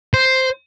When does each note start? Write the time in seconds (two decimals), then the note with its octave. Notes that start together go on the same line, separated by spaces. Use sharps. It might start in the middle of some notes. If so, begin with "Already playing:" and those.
0.14 C5